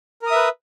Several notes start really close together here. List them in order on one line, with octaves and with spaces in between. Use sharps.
A#4 D#6 E5 B4